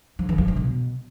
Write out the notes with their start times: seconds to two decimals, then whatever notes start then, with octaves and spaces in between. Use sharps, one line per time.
0.19 F3
0.29 E3
0.38 F3
0.48 E3
0.56 B2